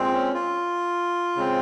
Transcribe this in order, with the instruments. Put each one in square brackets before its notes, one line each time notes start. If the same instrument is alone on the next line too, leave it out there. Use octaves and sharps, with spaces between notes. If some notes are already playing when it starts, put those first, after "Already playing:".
Already playing: [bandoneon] A#2 G#3 C4
C#4
F4
C#3 G#3 C4